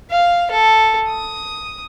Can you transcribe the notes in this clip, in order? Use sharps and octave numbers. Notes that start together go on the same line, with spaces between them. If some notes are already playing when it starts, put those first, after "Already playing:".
F5
A4
D#6